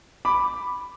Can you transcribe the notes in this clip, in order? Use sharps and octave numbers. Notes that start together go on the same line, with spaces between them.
B5 D6